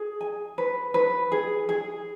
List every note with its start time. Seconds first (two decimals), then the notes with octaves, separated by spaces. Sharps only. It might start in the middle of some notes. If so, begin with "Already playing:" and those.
Already playing: G#4
0.21 G#5
0.58 B4
0.94 B4
1.32 G#4
1.69 G#4